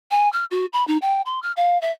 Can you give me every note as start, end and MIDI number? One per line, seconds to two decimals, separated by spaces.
0.11 0.31 80
0.33 0.45 89
0.51 0.66 66
0.73 0.86 83
0.88 0.98 63
1.02 1.22 79
1.26 1.40 84
1.43 1.52 89
1.57 1.80 77
1.82 1.92 76